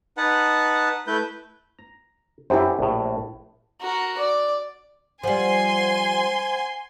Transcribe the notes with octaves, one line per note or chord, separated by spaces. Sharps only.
D#4 B4 F#5 A5
A3 E4 B4 G6
A#5
F#2 E4 G4 C5 E5
A#1 A2
F#4 A#4
D5
F3 G3 C5 F#5 G#5 C6